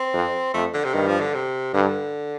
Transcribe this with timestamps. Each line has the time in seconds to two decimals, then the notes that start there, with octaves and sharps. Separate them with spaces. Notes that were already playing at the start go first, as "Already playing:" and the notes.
Already playing: C4
0.13 F2
0.54 F2 A3
0.74 D3
0.84 C3
0.94 G2 D#3
1.07 F3
1.21 D3
1.34 C3
1.74 G2 D3